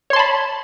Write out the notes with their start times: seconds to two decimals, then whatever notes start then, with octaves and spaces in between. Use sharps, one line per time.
0.10 C#5
0.13 C6
0.16 A5
0.19 B5